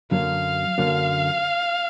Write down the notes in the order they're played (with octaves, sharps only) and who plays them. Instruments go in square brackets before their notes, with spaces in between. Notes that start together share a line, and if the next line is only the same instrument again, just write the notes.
[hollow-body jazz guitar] F#2 D3 F#3 A#3 D4 [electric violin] F5
[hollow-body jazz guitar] F#2 D3 F#3 A#3 D4